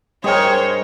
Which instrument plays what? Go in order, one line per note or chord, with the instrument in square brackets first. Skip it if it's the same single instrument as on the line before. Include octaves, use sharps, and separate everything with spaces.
[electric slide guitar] G2 G#4 G5 [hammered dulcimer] A#4 D#5 [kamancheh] C5 C#5